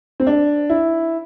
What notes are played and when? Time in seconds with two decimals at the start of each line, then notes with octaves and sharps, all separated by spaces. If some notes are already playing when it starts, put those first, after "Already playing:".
0.20 C4
0.27 D4
0.70 E4